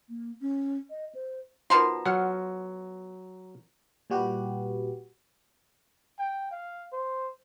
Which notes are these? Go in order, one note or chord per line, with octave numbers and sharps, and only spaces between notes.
A#3
C#4
D#5
C5
B2 F3 D#4 A#4 A#5 C6
F#3 F#5 F6
A#2 G3 F#4 G4 B4
G5
F5
C5